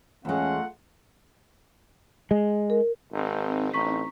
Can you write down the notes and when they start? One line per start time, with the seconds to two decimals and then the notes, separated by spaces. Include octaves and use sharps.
0.25 E2 G#3 A3 C#4 F4 F#5
2.31 G#3
2.70 A#4
3.12 G#1 C4 D#4
3.74 A1 A#5 C#6 B6